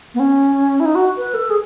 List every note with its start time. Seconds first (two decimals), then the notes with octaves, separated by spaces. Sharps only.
0.15 B3
0.20 C#4
0.80 E4
0.85 D#4
0.95 F#4
1.17 B4
1.34 A4
1.50 G#4